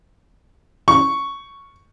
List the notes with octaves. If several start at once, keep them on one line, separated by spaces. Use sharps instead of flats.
C#6